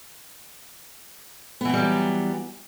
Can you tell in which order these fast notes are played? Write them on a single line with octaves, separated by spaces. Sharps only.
B3 E3 C4 G3 F#3